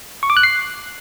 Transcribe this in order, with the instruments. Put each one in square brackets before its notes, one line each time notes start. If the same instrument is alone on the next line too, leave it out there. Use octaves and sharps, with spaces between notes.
[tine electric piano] C#6
D6
F#6
C7